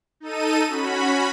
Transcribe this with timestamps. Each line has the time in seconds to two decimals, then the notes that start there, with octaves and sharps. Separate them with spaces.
0.20 D#4 A4 D#7
0.68 C#4 F#4 B5